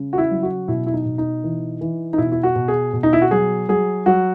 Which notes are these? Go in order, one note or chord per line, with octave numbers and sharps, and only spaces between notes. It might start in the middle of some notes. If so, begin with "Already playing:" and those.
Already playing: C#3
F#4
E4
F#3
F#4
B2 E4
E4
D#4
B2
D#4
E3
E3
D#4
B2 E4
E4
F#4
B2
G#4
B2
D#4
E4
F#4
F#3 G#4
F#3 G#4
F#3 F#4